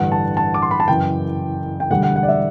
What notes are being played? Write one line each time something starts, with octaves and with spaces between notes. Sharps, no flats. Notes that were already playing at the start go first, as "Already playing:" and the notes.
Already playing: A1 G2 D3 G3 F#5
A5
A5
D6
C6
B5
A5
F#1 F#2 E3 G5
G5
E1 D2 D3 G3 F#5
F#5
F#5
D5
E5